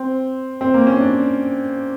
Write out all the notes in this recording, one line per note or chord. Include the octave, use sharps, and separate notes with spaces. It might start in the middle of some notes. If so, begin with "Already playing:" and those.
Already playing: C4
C4
A#3
C#4
D4